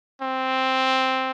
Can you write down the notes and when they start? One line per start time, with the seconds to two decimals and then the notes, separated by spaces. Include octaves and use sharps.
0.22 C4